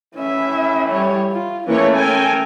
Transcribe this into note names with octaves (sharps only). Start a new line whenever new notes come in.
A2 E3 C#4 E4 E5
G3 C#5
F4
C#2 E3 A3 A#3 C#4 C#5
A4 A#4 G5 G#5